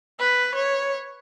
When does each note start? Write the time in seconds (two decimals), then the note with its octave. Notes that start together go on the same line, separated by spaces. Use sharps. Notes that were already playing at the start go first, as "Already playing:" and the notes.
0.19 B4
0.55 C#5